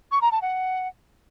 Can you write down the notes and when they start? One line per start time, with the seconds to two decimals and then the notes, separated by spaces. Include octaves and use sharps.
0.12 C#6
0.22 A#5
0.32 A5
0.42 F#5